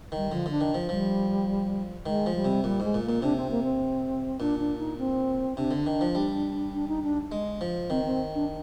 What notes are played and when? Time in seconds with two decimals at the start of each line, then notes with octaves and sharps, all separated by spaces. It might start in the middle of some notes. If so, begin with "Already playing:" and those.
0.12 D#3 G3
0.31 D3 F3
0.46 D3 D4
0.61 D#3
0.74 F3
0.89 F3 G3
2.06 D#3 G#3
2.26 F3
2.35 G3
2.45 C3
2.64 A#2 G3
2.80 G#2 G#3
2.94 A#2
3.03 A#3
3.09 A#2
3.22 C3 D4
3.37 C4
3.51 A#3
3.64 C4
4.40 A#2 D4
4.59 D4
4.79 D#4
4.98 C4
5.57 C3 D4
5.71 D3
5.86 D#3
6.01 F3
6.15 G3
6.74 D4
6.88 D#4
7.03 D4
7.32 G#3
7.61 F3
7.90 D#3 C4
8.05 C4
8.35 D4